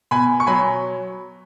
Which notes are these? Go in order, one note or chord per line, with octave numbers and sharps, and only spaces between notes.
B2 G#5 B5
C#6
F#3 G#5 B5